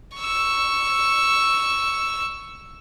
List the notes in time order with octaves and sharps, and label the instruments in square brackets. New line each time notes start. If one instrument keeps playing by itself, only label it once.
[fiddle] C#6 E6